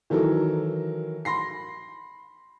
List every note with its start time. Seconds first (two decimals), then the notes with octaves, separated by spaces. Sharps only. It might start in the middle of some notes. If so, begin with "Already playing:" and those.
0.10 D#3 E3 F#3 A4 A#4
1.25 B5 C6 A#6 C7